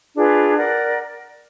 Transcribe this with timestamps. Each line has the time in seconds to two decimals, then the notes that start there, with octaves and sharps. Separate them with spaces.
0.15 D4 F4 G#4 B4
0.57 A#4 D5 F#5